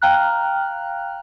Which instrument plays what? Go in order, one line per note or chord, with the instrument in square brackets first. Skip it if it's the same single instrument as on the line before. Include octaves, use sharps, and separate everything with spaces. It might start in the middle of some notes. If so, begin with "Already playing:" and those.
[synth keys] F5 G5 A#5 F6 F#6